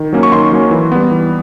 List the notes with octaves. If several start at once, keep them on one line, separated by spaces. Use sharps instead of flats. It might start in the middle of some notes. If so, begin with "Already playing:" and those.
Already playing: D#3
F#3 A#3 C#4
C#6
D#3 C6
F#3 A#3 C#4
E3
G3 B3
E3